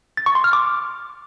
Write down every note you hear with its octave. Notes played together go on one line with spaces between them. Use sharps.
A6
C#6
C6
F6
D6